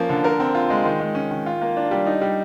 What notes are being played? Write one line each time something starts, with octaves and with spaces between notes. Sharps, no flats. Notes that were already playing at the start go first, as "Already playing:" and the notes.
Already playing: F3 A#3 C#4
D3
A#4
C4
F4
G#3
D#3
G#3
C#4
D#3
F4
A#3
D4
G3
D#4
G3